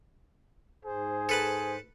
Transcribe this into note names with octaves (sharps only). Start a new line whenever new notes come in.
G#2 G#4 C5
A4 B4 A5